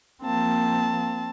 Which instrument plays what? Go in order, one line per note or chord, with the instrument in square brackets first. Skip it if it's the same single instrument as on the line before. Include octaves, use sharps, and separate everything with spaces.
[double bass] F3 A#3 [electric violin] C4 A5